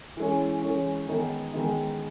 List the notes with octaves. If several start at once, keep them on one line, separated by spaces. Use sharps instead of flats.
E3 G#3 C#4
E3 G#3 C#4
D#3 G#3 B3 D#4
D#3 G#3 B3 D#4